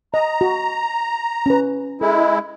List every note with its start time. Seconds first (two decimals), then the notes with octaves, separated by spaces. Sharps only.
0.14 D#5 A#5
0.41 F#4
1.46 C#4 B4
2.01 G#3 E4 A4